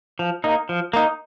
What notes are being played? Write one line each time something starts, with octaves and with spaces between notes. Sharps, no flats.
F3
A#3 D#4
F3
A#3 D#4